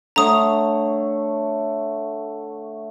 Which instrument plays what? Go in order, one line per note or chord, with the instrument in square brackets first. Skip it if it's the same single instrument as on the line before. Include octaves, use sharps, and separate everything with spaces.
[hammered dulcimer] D3 A3 C#5 [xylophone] A#5 D#6